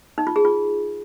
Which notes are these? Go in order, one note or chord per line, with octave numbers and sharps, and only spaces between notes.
D#4
F4
G#4
F4